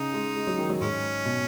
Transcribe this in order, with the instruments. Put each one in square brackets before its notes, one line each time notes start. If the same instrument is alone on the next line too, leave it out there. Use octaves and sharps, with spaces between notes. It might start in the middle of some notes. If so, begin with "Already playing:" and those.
Already playing: [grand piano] C#3 [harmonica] D#4
[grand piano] G#3
G#3
F#3
D#3
F#3
[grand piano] G#2 [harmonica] G#3 C#4
[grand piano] B2